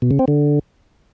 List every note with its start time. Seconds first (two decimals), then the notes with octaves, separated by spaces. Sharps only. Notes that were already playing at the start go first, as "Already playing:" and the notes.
0.02 B2
0.11 C#3
0.19 C4
0.28 D3